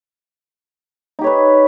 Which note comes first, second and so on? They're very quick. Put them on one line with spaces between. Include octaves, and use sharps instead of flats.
D#4 G4 C#5 B4